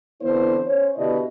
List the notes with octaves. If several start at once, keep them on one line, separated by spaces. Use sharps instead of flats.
D3 E3 B3 C4 E4 C5
C#4 C5 C#5
B2 D3 E4 G4 D5 D#5